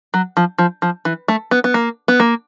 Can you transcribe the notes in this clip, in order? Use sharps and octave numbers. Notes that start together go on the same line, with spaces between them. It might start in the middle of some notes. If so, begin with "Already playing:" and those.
F#3
F3
F3
F3
E3
A3
B3
B3
A#3
B3
A#3